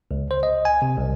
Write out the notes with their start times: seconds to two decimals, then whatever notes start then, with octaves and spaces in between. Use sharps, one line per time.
0.11 C#2
0.31 C5
0.43 D#5
0.65 G#5
0.82 C3
0.97 C2